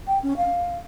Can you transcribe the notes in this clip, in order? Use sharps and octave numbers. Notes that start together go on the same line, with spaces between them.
G5
C#4
F5